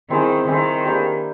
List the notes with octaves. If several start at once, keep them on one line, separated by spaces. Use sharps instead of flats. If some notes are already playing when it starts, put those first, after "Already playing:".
D#3 C4 E4 G#4 C5
D#3 C4 E4 G#4 C5
A#3 D4 G4 B4